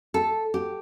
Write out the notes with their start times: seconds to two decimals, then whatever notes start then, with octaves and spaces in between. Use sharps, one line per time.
0.14 A4
0.54 G4